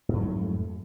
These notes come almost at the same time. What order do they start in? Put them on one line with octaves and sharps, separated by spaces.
G#2 F2 F#3 A3